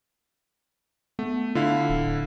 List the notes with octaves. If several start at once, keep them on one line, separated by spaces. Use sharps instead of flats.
A3 B3
D3 E4 F4 F5
D1